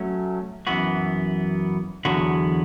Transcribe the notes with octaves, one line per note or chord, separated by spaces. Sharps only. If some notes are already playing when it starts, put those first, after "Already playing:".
Already playing: F#3 A3 C#4
F#2 E3 B3 F#4
E2 D3 F#3 B3 F#4